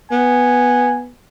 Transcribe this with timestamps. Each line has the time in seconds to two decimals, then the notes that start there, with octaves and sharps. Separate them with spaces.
0.12 B3 G#5